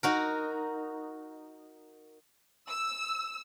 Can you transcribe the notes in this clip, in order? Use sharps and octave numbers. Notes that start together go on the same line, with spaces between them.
D#4 F#4 A#4
E6